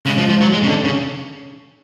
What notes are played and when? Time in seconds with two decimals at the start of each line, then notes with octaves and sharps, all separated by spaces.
0.06 C#3 G#3
0.18 F3
0.29 F3
0.41 F#3
0.53 G#3
0.63 C#3
0.69 D3
0.84 C#3